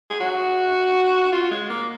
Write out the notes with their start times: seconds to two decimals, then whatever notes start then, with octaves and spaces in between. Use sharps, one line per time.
0.10 G#4
0.20 F#4
1.32 F4
1.51 G#3
1.70 A#3